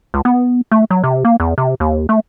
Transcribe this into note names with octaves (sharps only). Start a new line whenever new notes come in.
C#2
B3
A3
F#3
C3
A#3
E2
C3
D#2
A3